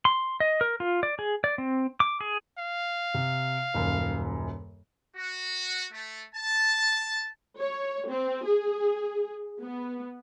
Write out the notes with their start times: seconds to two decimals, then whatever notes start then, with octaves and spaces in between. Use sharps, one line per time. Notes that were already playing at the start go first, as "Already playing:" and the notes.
0.05 C6
0.40 D#5
0.61 A#4
0.80 F4
1.03 D5
1.19 G#4
1.44 D5
1.58 C4
2.00 D6
2.21 G#4
2.58 F5
3.14 C3
3.74 D#1 F#2
5.17 F#4
5.93 A3
6.35 A5
7.59 C#5
8.09 C4
8.45 G#4
9.61 B3